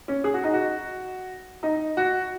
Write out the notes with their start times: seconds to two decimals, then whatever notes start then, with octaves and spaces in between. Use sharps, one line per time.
0.08 C#4
0.24 G#4
0.34 F#4
0.44 D#4
0.53 F#4
1.63 D#4
1.97 F#4